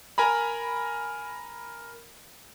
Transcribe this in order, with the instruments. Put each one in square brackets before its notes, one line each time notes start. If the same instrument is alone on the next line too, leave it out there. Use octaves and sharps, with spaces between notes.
[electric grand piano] A#4 G#5 A#5 B5